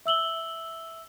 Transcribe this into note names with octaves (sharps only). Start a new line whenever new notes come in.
E5 E6 F#7 G7